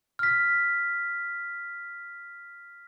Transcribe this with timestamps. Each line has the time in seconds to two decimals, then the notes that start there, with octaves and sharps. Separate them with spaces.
0.19 F6 B6